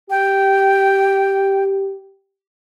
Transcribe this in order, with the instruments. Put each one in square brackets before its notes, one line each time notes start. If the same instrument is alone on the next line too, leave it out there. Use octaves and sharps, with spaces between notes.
[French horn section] G4 [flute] G5